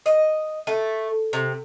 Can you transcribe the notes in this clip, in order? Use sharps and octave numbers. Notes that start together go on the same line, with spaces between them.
D#5
A3
C3